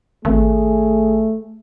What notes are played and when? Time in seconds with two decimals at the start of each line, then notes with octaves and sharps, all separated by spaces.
0.25 G#1 A3 G#4